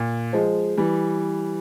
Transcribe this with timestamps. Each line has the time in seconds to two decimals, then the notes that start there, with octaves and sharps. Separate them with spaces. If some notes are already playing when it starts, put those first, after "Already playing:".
Already playing: A#2
0.33 F3 G#3
0.77 E3 G3